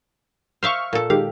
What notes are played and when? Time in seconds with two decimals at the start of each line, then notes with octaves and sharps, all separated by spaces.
0.63 C5 E5 F5 C#6 F6
0.93 A#2 A4
1.10 D#3 G#3 G4 F5